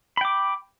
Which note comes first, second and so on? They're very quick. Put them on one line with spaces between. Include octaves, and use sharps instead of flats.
B5 G5 D6